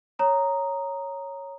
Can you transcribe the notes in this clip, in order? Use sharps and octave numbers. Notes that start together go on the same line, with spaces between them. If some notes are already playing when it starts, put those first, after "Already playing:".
C#5 A#5 D#6